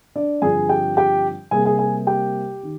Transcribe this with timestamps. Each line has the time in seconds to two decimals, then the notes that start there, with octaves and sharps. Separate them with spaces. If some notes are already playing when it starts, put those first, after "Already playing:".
0.16 D4 D5
0.42 G2 D3 F3 C4 G#4 G#5
0.69 G4 G5
0.97 G4 G5
1.51 C3 G3 A#3 G#4 G#5
1.65 G#4 G#5
1.79 G#4 G#5
2.07 G4 G5
2.63 D#3